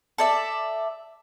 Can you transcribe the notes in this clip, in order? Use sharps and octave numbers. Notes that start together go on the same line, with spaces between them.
A4 D5 E5